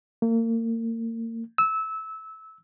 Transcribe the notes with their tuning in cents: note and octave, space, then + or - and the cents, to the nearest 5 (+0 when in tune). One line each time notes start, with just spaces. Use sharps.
A#3 -35
E6 -20